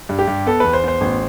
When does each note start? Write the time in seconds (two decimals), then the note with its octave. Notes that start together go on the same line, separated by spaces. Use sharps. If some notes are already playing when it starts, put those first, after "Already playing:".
0.09 G2
0.19 G4
0.27 G2
0.46 B3 A4
0.60 E2 B4
0.73 C5
0.84 B3 C5
1.01 A1